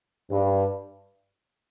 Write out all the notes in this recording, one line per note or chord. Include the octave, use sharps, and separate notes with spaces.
G2